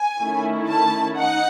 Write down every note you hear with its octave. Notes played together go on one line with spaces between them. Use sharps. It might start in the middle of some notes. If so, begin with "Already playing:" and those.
Already playing: G#5
D#3 A3 C#4 E4
A5
D#4 F#5